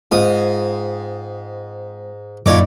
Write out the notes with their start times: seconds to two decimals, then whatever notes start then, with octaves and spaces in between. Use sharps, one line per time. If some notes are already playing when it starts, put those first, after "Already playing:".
0.12 G#2 G#3 C4 F4 D#6
2.46 F#2 A#2 D#4 E4 C#5 D5 D6